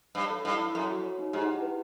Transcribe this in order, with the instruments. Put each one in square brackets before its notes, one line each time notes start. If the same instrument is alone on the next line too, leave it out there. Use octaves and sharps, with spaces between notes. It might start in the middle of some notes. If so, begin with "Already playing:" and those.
[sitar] G2 [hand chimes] C#5
[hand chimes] A4
[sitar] G2 [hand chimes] E4
[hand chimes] E4
[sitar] F#2 [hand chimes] A4
[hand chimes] F#4
C#5
D#4
[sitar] G#2 [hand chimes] G4
[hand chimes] E4
B4